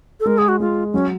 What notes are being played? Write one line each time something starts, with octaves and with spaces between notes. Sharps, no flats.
A4
G#3 A#4
G#4
F#4
G#3 F4
F#3 C#4